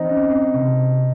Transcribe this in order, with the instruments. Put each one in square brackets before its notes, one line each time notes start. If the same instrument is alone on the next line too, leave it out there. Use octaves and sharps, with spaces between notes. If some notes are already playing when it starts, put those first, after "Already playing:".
Already playing: [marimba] E3 [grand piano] C4 D#4
[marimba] C#4
C4
C3